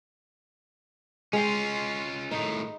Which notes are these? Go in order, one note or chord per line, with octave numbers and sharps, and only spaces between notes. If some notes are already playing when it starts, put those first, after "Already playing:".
G#3 C#4 F4 G5
A2 D#3 D#4